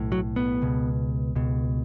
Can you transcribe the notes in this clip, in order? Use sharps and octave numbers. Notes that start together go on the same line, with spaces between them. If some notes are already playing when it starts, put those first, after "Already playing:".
Already playing: B1 A2
F#3
B3
C#2 B2
C#2 B2